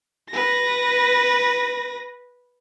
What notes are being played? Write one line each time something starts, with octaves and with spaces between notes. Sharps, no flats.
B4 A#6